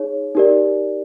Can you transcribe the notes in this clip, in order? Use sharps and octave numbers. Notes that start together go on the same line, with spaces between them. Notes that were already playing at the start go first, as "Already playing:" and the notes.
Already playing: D#4 G#4 C#5
D#4 G4 A#4 D5